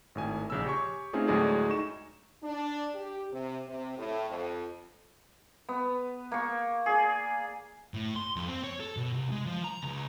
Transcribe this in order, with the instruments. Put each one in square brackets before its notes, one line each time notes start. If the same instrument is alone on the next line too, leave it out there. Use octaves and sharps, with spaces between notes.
[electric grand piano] G#1 A2 G#5
A#1 C#3 C#4 E6
G4 C#5 G#5 C6 C#6
A3 C4 C#4 D#4 F4 G#4
D2 A2 F#3 G#3 G#4 D5
D#4 C#6 E7
[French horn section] D4
G4
C3
C3
A2
F2
[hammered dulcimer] B3
A#3 C#6
G#4 D5
[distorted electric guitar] A2
C6
F2
C4
C#5
A4
B2
C2
G#3
F3
A#5
C#2